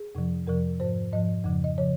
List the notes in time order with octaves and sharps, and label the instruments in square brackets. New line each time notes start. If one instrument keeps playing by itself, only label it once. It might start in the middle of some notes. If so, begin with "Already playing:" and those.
Already playing: [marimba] G#4
F2 C3 F3
F2 C3 F3 A#4
G#2 F3 C5
G#2 F3 D#5
F2 C#3 F3
D#5
C#3 F3 C#5